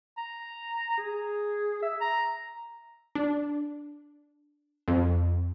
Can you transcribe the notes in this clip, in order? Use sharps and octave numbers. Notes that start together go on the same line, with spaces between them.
A#5
G#4
E5
A#5
D4
F2